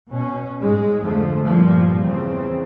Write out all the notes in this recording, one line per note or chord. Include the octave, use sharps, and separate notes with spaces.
B2 C#4
G#2 G#3
F2 D3 F3 A3
G2 A#2 F3 G3 A#3
E2 C#3 C4